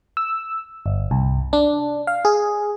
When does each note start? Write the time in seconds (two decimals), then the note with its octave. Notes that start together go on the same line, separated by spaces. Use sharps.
0.17 E6
0.86 G1
1.11 C2
1.53 D4
2.07 F5
2.25 G#4